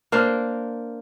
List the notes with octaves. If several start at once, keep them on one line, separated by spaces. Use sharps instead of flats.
A#3 D4 A#4 C5